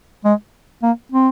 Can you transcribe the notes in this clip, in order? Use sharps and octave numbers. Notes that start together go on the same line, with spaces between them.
G#3
A#3
C4